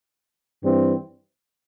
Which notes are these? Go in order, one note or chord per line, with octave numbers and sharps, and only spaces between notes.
G2 E3 G3 C4